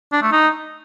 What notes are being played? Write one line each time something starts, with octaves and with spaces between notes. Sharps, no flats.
D4
A3
D#4